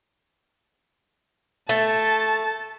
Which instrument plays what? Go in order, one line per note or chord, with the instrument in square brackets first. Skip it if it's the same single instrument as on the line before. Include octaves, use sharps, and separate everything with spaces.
[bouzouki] A3 [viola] A5